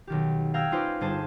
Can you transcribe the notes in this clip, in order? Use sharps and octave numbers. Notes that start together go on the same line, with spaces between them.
B1 D#3 G4
F5 G5 A#5 E6 G#6 A#6
C#4 D#4 F4 B4 C5 D5
G1 G#4 C5 A5 D#7